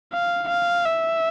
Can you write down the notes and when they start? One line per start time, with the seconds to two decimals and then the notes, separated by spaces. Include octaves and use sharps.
0.13 F5
0.49 F5
0.86 E5